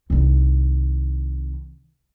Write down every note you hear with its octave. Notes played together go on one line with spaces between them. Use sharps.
C2 D#3